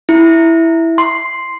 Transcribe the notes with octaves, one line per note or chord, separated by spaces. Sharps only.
E4
C6